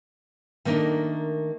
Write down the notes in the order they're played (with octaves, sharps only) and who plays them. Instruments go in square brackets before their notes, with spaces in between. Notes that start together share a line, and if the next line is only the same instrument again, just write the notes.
[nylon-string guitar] D#3 A3 A#3 D4 D#4